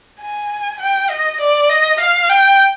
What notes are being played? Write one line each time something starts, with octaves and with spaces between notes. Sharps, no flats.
G#5
G5
D#5
D5
D#5
F5
G5